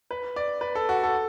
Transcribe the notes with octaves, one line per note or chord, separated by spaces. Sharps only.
B4
D5
B4
A4
F#4
A4